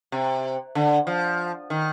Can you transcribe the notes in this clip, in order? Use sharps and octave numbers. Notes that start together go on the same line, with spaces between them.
C3
D3
F3
D#3